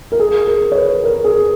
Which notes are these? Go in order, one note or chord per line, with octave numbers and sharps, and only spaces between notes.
A#4
G#4
A#4
C#5
B4
A#4
G#4